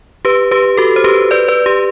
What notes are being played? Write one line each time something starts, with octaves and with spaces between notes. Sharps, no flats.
G4 B4
G4 B4
F#4 A4
C5
G4 B4
B4 D5
B4 D5
G4